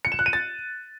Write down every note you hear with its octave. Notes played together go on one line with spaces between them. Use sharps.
C#7
E7
F#6
D#7
A6